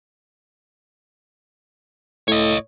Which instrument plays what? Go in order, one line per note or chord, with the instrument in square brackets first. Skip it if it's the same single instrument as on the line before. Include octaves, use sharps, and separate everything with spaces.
[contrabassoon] A2 [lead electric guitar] C#5 D#5